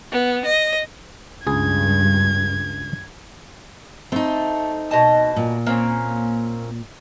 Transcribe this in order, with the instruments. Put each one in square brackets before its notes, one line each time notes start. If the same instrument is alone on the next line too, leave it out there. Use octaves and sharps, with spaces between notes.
[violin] B3
D#5
[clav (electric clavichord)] C#2 G#4 [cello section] G2 [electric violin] G#6
[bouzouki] A3 [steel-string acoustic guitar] C4 D#4
[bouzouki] B2 D#5 A5
[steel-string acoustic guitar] A#2
[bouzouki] A#3 C4 C#4